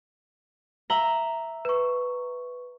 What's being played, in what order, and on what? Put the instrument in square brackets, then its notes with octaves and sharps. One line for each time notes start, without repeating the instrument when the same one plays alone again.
[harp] E5 A#5 [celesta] F#7 G7
[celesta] B4 C#6